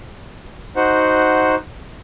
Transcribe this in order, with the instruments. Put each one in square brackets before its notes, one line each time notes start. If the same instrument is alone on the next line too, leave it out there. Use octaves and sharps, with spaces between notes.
[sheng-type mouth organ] D#4 F#4 C5 F#5